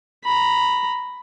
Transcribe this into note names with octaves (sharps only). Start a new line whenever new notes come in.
A#5 B5